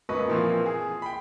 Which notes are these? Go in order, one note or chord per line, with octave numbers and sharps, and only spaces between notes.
F#2 F#3 A#3 B4 D#5 C#6
A#2 E3 F3 A#3 C4
G#4
G5 B5